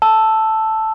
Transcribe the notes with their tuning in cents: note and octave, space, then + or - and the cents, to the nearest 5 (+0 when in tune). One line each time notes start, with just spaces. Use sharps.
A5 +0 E6 +0